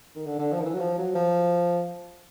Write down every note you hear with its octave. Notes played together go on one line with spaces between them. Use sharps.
D#3
D3
D3
F3
D#3
E3
F#3
F3
F#3
F3